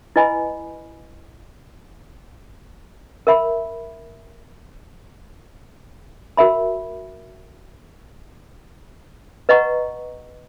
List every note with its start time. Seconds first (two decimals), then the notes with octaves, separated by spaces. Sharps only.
0.16 E4 B4 D#5 G#5 B5
3.27 A#4 E5 B5
6.37 F#4 A#4 E5 B5
9.49 B4 D#5 F#5 A#5 C#6